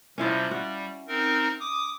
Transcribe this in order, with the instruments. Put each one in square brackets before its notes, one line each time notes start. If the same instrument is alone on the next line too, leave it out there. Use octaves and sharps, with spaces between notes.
[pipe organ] C3 F3 G3 [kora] C#4 E4 F4
[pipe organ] G3 [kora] F#4
[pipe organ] C4 D#4 A#4
D6 D#6